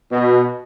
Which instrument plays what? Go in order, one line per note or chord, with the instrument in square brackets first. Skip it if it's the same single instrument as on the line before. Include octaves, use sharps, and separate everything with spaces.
[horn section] B2